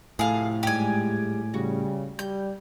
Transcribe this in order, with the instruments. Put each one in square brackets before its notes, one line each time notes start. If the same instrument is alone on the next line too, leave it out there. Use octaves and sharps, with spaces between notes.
[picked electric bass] A2 [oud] C3 F3 A3 [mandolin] G#4 F5
[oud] G#2 G3 G#3 [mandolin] G4 G#5
[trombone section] C#3 G3 [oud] F#4
[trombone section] G3 [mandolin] G6